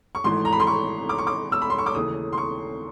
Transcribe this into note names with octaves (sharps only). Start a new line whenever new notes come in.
C#6
G#1 G#2 E3 A3 C6
A#5
B5
C6
C#6
D6
C#6
D6
E6
B5
C6
C#6
D6
D#2 C#3 E3 A3 D#6
C6
C#6